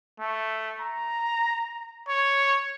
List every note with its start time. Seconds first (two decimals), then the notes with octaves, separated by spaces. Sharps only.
0.20 A3
0.80 A#5
2.09 C#5